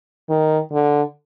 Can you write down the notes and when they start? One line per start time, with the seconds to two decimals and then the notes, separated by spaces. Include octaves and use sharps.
0.30 D#3
0.73 D3